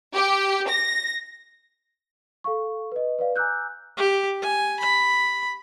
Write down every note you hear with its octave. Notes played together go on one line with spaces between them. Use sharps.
G4
A#6
A4 F5 C#6
B4 D#5
B4 D5 F5
G#5 A#5 D6 E6 F#6 G6
G4
G#5
B5